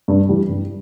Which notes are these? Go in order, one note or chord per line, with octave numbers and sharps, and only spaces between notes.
G2
E3 G3
G2